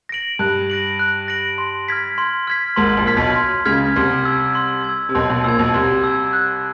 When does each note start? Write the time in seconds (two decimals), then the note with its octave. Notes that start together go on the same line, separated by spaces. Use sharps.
0.09 A#6 D7 F#7
0.39 G2 F#6
0.70 A#6 D7 F#7
0.99 F#6
1.28 A#6 D7 F#7
1.58 C6
1.88 F6 G#6 B6
2.18 C6
2.47 F6 G#6 B6
2.76 G#1 G#2 C6
2.97 A#1 A#2
3.07 F6 G#6 B6
3.17 B1 B2
3.36 C6
3.65 C#2 C#3 F6 G#6 B6
3.96 C2 C3 C6
4.25 E6 G#6
4.55 C6
4.84 E6 G#6
5.09 C3
5.15 B1 B2 C6
5.29 B1 B2
5.44 A#1 A#2 E6 G#6
5.59 B1 B2
5.74 C2 C3 C6
6.04 E6 G#6
6.33 F#6